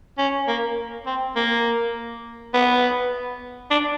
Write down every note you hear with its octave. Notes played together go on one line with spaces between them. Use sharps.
C#4
A#3
C4
A#3
B3
D4